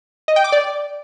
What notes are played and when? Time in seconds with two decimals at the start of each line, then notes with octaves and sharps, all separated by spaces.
0.28 D#5
0.36 G5
0.44 D6
0.52 D5